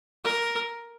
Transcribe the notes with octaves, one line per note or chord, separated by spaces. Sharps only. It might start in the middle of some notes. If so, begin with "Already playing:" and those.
A#4